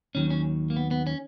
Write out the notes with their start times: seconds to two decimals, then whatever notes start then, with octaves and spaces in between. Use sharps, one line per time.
0.15 D#2 D#3 F#3 C#4
0.30 C#4
0.70 A#3
0.76 B3
0.91 B3
1.07 C#4